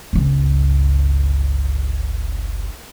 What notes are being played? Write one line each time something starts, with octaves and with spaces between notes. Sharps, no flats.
G1 C#2